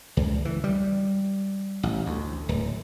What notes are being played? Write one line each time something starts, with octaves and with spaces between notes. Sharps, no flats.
C#2
E3
G3
A1
D2
D1